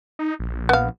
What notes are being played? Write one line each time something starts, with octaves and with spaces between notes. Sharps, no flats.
D#4
A#1
B3 F5